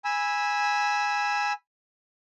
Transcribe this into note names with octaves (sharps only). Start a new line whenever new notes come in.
G#5 B5 E6